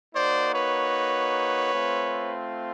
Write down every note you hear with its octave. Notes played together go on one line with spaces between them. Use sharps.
A#3 D#4 F#4 C5 D5
B4 C#5
A3 C4 F4